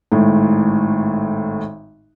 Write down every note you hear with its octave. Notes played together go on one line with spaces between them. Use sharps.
G#1 A2